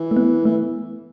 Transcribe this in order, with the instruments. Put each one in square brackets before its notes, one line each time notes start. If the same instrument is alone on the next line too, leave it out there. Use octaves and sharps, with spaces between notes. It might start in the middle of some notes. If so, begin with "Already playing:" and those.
Already playing: [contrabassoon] E3
[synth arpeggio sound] A3
B3
[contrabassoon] E3 [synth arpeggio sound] A3